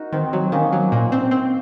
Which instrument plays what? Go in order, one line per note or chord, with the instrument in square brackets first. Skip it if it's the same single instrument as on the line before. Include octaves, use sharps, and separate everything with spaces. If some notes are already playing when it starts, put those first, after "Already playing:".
Already playing: [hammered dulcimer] D#4 F#4 A#4
[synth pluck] D#3 [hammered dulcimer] C4
[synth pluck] F#3
[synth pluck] D#3 [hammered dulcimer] A#3 C#4
[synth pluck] F#3
A#2
C4
C4